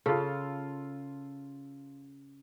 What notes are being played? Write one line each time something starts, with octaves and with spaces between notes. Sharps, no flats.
C#3 F4 A4